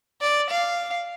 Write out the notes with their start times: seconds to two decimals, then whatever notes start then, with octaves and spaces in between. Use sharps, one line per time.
0.21 D5
0.51 F5